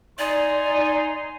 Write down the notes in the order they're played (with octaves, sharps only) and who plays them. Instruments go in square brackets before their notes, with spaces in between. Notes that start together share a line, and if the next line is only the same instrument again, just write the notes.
[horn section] D#4 G#5 C6 [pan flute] D5